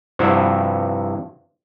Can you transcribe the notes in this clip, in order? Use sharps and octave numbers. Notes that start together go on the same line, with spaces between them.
G2 C3 F3 E4 F#4 C5